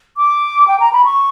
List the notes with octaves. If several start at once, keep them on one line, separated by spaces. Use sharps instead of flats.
D6
G5
A#5
B5
C#6